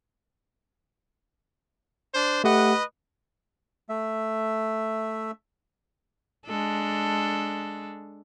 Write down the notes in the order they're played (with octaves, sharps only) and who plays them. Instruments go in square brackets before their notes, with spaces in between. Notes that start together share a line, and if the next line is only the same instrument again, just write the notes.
[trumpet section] D4 C5
[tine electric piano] A3 G4 F#5 [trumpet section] B4 D#5
[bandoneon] A3 E5
[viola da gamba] G#3 D4 A4